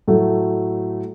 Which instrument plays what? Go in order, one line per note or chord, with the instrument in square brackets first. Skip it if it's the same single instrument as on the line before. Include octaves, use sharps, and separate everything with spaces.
[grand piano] A2 F#3 A3